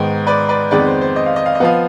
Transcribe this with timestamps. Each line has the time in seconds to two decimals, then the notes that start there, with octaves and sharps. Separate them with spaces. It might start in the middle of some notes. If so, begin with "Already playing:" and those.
Already playing: G#2 D#3 B3
0.27 B4 D5
0.49 B4 D5
0.71 F2 D#3 G#3 B3 B4 D5
0.87 C5
1.01 C5
1.16 D#5
1.26 F5
1.36 D#5
1.46 F5
1.55 D#5
1.60 F3 B3 F5